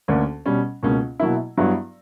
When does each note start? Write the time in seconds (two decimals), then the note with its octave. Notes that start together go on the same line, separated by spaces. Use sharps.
0.08 D2 D3 A#3 C#4
0.46 B2 G3 C#4
0.83 C#2 B2 A#3 C#4
1.20 B2 F#3 A#3 E4
1.58 G2 F#3 B3 E4